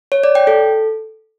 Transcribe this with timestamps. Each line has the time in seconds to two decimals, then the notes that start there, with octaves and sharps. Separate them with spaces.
0.12 C#5
0.24 D5
0.35 G5
0.47 A4